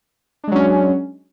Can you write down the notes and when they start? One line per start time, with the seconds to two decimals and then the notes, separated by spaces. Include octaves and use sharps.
0.44 D4
0.48 G#3
0.52 F#3
0.55 C#4